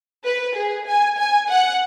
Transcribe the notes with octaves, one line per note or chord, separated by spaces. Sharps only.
B4
G#4
G#5
G#5
F#5